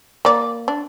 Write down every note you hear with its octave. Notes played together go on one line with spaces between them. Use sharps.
A#3 D5
D4